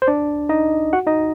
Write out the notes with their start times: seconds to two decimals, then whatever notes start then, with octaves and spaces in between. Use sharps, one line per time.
0.02 C5
0.07 D4 D5
0.49 D#4 D#5
0.93 F#4 F#5
1.07 D#4 D#5